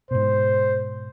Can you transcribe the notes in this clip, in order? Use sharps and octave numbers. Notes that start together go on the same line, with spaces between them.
G#2 B2 C5